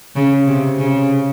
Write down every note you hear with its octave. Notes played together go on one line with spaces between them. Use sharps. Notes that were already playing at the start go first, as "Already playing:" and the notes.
C#3
C3
C#3